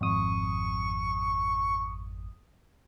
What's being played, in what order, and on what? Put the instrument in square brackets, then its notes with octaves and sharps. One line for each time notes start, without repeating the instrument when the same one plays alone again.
[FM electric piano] G#1 F2 D#6 [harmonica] C#6